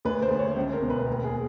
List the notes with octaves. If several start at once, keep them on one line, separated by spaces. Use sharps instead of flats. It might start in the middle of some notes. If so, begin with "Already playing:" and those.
D2 B4
C5
D2
C#5
C#2 C5
A#4
B2
B4
D#2 A#4
G#4